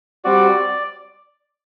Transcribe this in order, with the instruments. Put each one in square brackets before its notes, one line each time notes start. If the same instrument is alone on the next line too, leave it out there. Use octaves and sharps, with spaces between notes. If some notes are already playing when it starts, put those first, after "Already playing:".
[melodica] G3 C4 F#4 D5